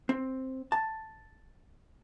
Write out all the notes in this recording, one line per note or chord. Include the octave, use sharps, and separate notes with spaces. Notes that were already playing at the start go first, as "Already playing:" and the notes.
C4
A5